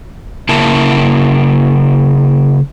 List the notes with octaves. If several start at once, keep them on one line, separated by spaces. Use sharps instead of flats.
C#3 A#3 E4 A#4 A5